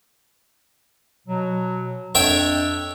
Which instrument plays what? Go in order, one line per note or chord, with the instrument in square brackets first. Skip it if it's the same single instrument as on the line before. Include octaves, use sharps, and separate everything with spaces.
[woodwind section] B2 F#3
[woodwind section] F2 D4 [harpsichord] C#5 E5 G5